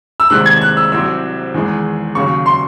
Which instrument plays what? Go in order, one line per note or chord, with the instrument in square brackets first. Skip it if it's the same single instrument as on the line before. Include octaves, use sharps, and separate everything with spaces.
[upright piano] E6
C2 C3 D#3 G#3 C4 F#6
G#6
F#6
E6
C2 C3 F#3 C4 E6
E2 D#3 G#3
D#2 C#3 F#3 C#6
C6